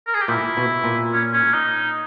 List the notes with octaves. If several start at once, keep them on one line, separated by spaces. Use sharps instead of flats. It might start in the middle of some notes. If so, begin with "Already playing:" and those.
A#4
G#4
G4
A#2 E4
B2
A#2
C#4
C#4
D#4